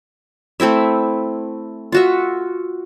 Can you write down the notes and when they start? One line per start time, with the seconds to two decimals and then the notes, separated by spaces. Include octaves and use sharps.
0.60 A3 C4 E4 E5
1.92 F4 F#4 E5